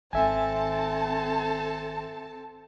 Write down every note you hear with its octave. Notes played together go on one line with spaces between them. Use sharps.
G#1 D#3 C4 A4 E5 G#5 A5